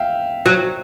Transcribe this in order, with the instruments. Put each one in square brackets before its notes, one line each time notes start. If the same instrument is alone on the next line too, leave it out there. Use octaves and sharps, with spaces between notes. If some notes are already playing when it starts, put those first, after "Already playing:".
Already playing: [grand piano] E5 F5 G5
[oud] F#3